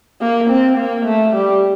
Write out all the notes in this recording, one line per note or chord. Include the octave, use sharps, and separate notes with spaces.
A#3
C4
A#3
A3
G3